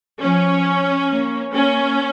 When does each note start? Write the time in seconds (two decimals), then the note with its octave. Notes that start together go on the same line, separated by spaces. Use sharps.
0.21 F3 C#4
1.09 A#3
1.53 A#3 C#4